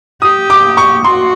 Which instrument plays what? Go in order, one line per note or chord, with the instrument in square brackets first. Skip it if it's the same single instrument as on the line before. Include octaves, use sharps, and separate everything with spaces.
[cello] G4 [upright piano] D#6
[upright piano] D6
C#6
[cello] F#4 [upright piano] C6